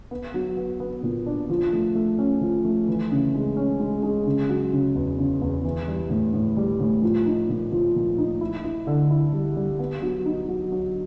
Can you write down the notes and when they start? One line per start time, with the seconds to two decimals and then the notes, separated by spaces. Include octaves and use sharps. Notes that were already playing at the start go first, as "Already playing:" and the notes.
0.11 B3
0.34 F#3
0.57 B3
0.80 B3
1.03 A#2
1.26 D4
1.49 F3
1.72 A3
1.95 A3
2.19 C#4
2.41 F3
2.65 A3
2.88 E3
3.11 C#3
3.34 G#3
3.57 C#4
3.80 G#3
4.03 G#3
4.26 C#3
4.49 F#3
4.73 C#3
4.95 E2
5.18 C#3
5.41 E2
5.65 E3
5.88 G3
6.10 A2
6.33 A2
6.57 G3
6.80 A2
7.03 F3
7.26 D#4
7.49 A#2
7.72 F3
7.95 A#2
8.18 D#4
8.41 E4
8.64 E4
8.87 D3
9.10 E4
9.33 G3
9.56 G3
9.79 B3
10.02 F#3
10.26 D#4
10.49 F#3
10.72 F#3